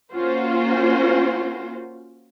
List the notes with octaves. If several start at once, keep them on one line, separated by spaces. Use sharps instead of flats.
A#3 C#4 F4 F#4 C5